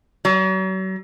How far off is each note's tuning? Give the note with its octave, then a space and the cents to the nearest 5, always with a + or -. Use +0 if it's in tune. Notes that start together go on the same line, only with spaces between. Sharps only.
F#3 +40